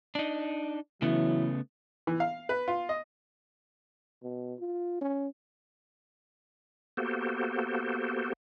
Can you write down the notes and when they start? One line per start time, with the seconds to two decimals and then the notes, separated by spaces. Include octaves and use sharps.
0.15 D4 D#4
1.02 C#3 E3 F#3 A3 B3 E4
2.07 E3
2.20 F5
2.49 B4
2.68 F4
2.89 D#5
4.23 B2
4.59 F4
5.01 C#4
6.97 A#3 B3 F#4 G4 A4 C5